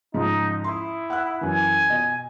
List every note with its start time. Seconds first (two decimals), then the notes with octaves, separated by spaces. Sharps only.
0.14 G#2 C#3 F3 D#4
0.64 E4 C6 D#6
1.10 F#5 E6 F#6
1.41 F#2 E3 G#5
1.90 B2 D#5